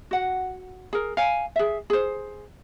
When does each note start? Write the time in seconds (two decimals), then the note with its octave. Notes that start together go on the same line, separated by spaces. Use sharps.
0.11 F#4 F#5
0.93 G#4 A#4
1.17 F5 G#5
1.56 G#4 E5
1.90 G#4 C5